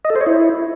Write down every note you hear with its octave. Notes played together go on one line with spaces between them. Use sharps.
D#5
A4
C5
C#5
E4